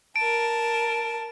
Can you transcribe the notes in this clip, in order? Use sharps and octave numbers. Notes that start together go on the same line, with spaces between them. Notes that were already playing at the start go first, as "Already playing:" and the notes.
A#4 A5 D7